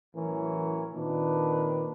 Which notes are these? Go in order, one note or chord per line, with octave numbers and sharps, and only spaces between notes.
A1 E3 F#3 C#4 A#4
A#2 D#3 C4 D4 B4